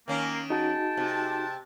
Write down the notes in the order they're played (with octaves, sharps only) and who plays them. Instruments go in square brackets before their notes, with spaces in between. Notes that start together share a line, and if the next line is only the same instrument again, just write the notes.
[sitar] D#3 C#4 [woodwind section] A#3
[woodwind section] G#3 G5 A5 [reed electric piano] D#4 F#4
[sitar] C3